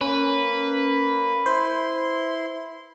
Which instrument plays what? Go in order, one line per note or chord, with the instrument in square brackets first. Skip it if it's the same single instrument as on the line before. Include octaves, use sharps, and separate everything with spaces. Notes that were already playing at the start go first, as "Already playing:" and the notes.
[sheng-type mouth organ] A#3 [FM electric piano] C#4 [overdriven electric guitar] B4
[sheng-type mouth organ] E4 C6 [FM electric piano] C5